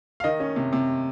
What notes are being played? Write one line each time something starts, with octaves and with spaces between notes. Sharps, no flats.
F5
D#3 D#5
C#4
C3
C3